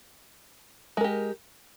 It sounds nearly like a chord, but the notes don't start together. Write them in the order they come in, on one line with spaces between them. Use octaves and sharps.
G#3 A#4 G4